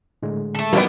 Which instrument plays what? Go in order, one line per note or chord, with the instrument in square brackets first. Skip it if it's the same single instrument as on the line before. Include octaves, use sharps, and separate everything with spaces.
[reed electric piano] A2 D3 G#3
[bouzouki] A3 A4
[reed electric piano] E3 F3 D#4 [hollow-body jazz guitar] G3 D4 G4 [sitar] A#3 B3